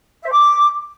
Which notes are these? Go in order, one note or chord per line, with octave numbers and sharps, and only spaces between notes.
E5
C5
D6